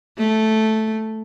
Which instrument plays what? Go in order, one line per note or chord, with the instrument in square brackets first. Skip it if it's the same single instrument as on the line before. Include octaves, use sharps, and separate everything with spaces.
[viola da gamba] A3